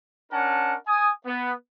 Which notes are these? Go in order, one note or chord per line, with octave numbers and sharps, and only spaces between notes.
C#4 D4 A#4 F#5 A5
G#5 D#6
B3